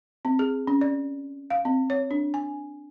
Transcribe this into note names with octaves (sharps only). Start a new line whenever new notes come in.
C4
G#4
C#4
D5
F5
C4
C#5
D4
G#5